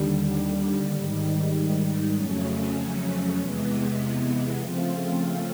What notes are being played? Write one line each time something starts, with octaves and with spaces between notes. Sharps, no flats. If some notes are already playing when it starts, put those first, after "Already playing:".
Already playing: D#2 D3 G3
G#2 D#3 G3
F2 C#3 F#3 A3 C#4
E2 C3 E3 G#3 B3
C#3 F3 A3 C4 F4